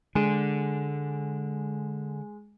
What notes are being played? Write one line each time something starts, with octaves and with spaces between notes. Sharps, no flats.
D3 G#3